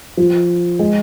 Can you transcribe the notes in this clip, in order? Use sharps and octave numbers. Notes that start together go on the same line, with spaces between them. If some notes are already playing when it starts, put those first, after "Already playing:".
F3
G#3